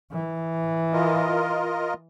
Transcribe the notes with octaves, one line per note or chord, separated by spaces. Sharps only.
E3
F4 A#4 D#5